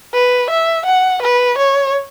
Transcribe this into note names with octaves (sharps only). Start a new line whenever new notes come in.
B4
E5
F#5
B4
C#5